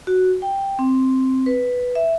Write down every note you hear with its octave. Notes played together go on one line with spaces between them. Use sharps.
F#4
G5
C4
B4
E5